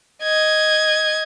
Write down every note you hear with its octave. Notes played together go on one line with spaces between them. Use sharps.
D#5 G#6